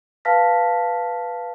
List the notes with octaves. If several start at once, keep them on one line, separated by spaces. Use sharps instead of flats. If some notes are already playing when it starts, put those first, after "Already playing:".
B4 F5 A5 F6 A#6 B6